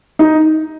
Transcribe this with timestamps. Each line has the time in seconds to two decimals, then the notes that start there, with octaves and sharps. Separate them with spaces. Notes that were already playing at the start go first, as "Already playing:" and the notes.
0.19 D#4